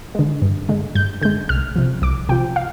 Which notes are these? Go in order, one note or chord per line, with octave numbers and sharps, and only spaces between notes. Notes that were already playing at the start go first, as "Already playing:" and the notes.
D3 G#3
G2
D3 G#3
G2 G6
D3 G#3 G6
C2 F6
C3 F3
C2 D6
C3 F3 G5
F5